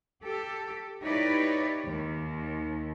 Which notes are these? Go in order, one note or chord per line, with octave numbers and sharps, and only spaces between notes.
G4 A4
D#4 E4 G4 B4 C#5 D5
D#2